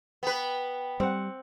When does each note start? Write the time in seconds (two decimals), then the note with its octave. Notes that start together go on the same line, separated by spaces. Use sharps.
0.23 B3 B4 G5
1.00 G3 C4 F#5